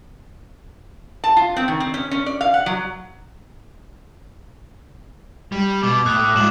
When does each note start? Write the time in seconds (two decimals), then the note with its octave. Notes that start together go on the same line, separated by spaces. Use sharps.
1.24 A5
1.37 F4
1.56 C4
1.68 D#3
1.80 C4
1.94 C#4
2.11 C#4
2.26 D5
2.41 F5
2.54 F#5
2.66 F#3
5.52 G3
5.83 B2 D6
6.06 A2 D#6 F#6
6.36 G#2 F3 E7 F#7